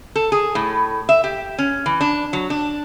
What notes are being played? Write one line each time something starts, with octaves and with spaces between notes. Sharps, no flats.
A4
G#4
A2
E5
G4
C#4
E3
D4
F#3
D4